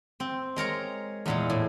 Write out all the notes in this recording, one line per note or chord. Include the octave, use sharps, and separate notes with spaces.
C4
G#3 A#4 C#5 A#5
E2 A#2 G#3
A2